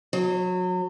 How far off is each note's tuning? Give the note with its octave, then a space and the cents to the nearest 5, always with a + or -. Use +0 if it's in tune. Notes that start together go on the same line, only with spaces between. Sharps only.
F#3 -25